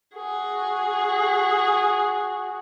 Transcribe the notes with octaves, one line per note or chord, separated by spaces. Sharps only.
F#4 G#4